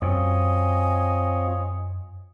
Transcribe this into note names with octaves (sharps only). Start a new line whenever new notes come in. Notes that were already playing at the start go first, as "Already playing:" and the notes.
F#2 C4 F4 C#5 D#5 G#5